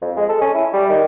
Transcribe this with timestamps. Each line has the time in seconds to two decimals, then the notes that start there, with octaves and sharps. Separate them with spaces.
0.01 F2
0.17 G#3
0.29 A4
0.41 C#4
0.54 E4
0.73 G3
0.89 D#3